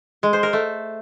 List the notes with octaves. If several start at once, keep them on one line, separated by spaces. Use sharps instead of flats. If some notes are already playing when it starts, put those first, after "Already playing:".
G#3
C5
A#4
A3